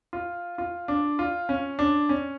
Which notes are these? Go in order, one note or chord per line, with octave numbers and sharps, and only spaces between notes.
F4
F4
D4
F4
C#4
D4
C#4